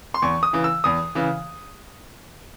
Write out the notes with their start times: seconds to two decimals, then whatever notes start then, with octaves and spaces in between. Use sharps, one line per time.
0.14 C6
0.22 E2 C#6
0.43 D#6
0.53 C#3 E3
0.64 E6
0.84 E2 D#6
1.15 C#3 E3